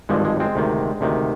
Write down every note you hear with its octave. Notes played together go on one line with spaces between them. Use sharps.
G#1 G2 D3 F3 G#3
G#3
G#3 C4
D2 C3 D#3
D2 C3 D#3